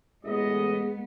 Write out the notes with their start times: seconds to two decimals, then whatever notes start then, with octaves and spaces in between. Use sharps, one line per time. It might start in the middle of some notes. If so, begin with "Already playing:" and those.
0.25 A1 G#3 B3 G#4 D#5